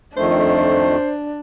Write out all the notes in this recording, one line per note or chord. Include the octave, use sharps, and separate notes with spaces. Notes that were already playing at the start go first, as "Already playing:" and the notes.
F2 D#3 A3 D4 C5